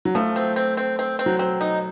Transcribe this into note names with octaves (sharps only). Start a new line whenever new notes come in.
F#3
F3 A3
C4
C4
C4
C4
C4
F#3
C4
D#4